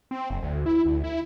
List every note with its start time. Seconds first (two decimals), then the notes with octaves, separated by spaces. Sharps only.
0.11 C4
0.30 F#1
0.42 D2
0.66 E4
0.86 D2
1.04 E4